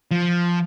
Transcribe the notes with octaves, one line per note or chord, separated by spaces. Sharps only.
F3